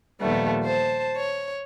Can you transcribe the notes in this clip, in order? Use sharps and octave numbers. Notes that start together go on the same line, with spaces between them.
D#2 A#2 F3 G3 A3 B3
C5 A5
C#5